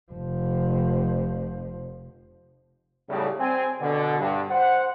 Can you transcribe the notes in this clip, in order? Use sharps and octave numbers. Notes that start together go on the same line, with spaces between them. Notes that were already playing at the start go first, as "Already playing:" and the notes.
F1 F3
B1 A2 C#3 G3
C4 G#5
B2 D3
G2
C5 F#5